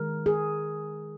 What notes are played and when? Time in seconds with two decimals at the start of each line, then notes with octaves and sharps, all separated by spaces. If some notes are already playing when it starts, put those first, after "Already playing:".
Already playing: D#3 G#3 A#4
0.26 G#4